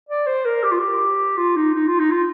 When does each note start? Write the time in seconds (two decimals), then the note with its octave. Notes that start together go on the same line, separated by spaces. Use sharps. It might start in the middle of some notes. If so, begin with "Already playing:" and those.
0.09 D5
0.27 C5
0.45 A#4
0.63 G4
0.71 F4
0.79 G4
1.37 F4
1.56 D#4
1.74 D#4
1.87 F4
1.99 D#4
2.11 F4